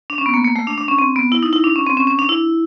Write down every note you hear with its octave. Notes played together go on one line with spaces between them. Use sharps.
D4
C#4
B3
A#3
A#3
A3
D4
D4
C#4
C4
B3
E4
D#4
E4
D4
C#4
C4
C#4
C#4
D4
E4